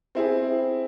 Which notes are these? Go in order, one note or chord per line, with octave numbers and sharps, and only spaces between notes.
C4 E4 G#4